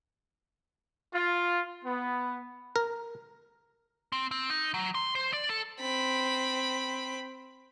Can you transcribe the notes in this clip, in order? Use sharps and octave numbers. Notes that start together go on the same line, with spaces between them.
F4
B3
A#4
C4
C4
D#4
F#3
C6
C5
D5
A4
C4 B5